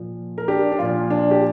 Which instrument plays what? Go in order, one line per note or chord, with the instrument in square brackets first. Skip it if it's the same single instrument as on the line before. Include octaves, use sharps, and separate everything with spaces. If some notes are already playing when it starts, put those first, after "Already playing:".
Already playing: [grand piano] A#2 F3
A#4
D4 G4
D4
A#2 F3 F4
D4
G4